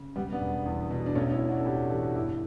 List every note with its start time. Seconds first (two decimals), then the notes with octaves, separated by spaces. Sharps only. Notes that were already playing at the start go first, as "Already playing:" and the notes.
Already playing: C#3
0.16 E1 G3 B3
0.33 B3 D4
0.40 E1
0.66 E2
0.90 B2
1.06 D4
1.15 B1 A3 C#4
1.32 C#4 E4
1.41 B1
1.49 D4 F#4
1.59 A4
1.65 A2 E4 G4
1.90 E3 F#4 A4
2.15 G1 E4 G4